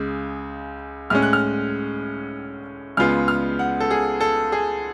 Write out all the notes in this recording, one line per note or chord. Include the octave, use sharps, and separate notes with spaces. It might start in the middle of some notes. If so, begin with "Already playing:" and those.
Already playing: C#2 C#3 G#3
A2 G#3 C#4 F6
F#6
F6
C#2 C#3 G#3 B3 F4 F6
F6
F#5
A4
G#4
A4
G#4